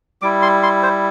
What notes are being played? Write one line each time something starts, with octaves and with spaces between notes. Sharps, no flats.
G3 E4 D6
C6
C6
C5